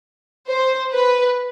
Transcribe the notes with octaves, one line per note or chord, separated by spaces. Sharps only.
C5
B4